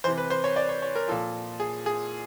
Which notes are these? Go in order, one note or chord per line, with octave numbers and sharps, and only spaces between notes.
C3 E3 C5
B4
C5
C#5
D5
C#5
C#5
A#4
A#2 F3 A4
G#4
G#4